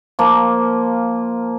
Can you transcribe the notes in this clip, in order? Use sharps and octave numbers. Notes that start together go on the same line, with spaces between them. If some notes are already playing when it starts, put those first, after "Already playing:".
F3 A#3